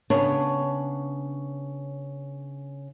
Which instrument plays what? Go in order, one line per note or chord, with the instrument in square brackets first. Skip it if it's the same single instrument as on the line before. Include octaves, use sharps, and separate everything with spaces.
[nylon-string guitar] C#3 B3 D4 C#5